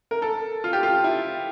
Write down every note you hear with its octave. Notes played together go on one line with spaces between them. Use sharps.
A#4
A4
F4
G4
F4
E4